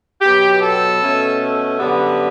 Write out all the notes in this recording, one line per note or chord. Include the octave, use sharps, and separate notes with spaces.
B2 F#3 B3 G4
A4
B2 A3 C#4
F#2 D3 G3 B3